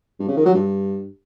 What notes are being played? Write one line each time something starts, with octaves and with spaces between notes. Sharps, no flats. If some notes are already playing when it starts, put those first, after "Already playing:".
G2
C#3
D#3
F#3
G2